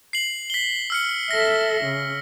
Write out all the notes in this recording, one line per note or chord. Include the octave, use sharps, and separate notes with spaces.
C7 F#7
B6 G7
E6 F6 C#7
A4 E5 A#6
C#3